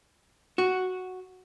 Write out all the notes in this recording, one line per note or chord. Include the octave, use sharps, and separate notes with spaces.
F#4